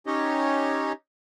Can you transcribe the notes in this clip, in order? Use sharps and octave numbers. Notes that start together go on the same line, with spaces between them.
C#4 D#4 G4 C#5 D#5